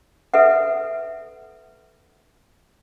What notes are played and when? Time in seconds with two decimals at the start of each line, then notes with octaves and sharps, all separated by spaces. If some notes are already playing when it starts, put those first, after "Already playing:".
0.34 A4 B4 E5 F#5